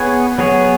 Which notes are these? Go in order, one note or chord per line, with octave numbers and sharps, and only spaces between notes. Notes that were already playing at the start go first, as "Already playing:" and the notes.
Already playing: B3 G#4 C#5
F#3 B3 G#4 C#5